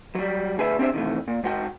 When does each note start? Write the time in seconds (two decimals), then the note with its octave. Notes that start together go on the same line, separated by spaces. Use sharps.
0.15 F#3 G3
0.58 D2 G#4 B4 E5
0.79 C4 D4 G4 G#4 C5 E5
0.93 C3 D#3 E3 A3
1.28 A#2
1.44 G#2 F#4 G5